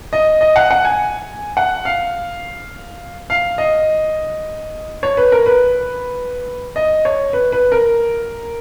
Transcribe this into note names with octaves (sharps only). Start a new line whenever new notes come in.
D#5
D#5
F#5
F#5
G#5
F#5
F5
F5
D#5
C#5
B4
A#4
B4
D#5
C#5
B4
B4
A#4